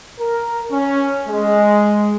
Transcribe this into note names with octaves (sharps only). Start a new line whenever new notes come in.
A#4
C#4
G#3